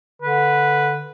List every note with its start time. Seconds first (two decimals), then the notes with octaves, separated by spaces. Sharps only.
0.22 D3 B4